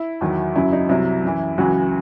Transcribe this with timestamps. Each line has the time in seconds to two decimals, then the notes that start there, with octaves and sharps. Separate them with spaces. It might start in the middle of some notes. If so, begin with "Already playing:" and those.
Already playing: E4
0.21 E2 D#3 F#3
0.56 F#2 C#3 F#3 E4
0.72 D#4
0.89 C2 C3 F#3 E4
1.24 F#2 E3
1.58 C#2 C#3 E3 F#3 F#4